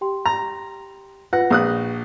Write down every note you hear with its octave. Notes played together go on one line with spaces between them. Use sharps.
G4 G5 C6
A#5
F4 B4 F#5 A#6
A#1 D#6 F#6